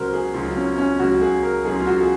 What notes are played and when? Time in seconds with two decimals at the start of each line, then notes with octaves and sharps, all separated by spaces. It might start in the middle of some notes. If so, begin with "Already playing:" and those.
Already playing: C#2 C#3 F#3 F#4 A#4 C5
0.13 G#4
0.34 C#2 C#3 F#3 F4
0.56 C#4
0.78 C#4
0.99 C#2 C#3 F#3 F#4
1.21 G#4
1.43 A#4
1.65 C#2 C#3 F#3 G#4
1.80 F4
1.87 F#4
2.00 G#4